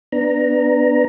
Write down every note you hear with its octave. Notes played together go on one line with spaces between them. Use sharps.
B3 D4 A#5